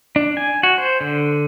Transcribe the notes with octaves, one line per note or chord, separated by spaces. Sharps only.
D4
G#5
F#4
C5
D3